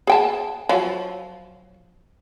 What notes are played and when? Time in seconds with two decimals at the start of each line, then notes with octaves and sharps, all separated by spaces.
0.07 G#4 G5 A5
0.69 F3 F#3